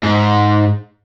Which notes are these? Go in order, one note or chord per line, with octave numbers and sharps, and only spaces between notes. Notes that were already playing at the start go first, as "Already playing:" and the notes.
G#2